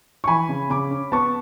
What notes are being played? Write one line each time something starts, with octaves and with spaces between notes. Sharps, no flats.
C#6
E3 G#5 B5
C#3
C#3 B5 D6
C#4
B3 A5 C#6